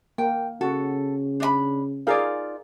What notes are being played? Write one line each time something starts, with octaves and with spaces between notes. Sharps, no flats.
A#3 G5
C#3 F#4 A4
D4 D#5 B5
D#4 F4 G#4 A#4 D5 F5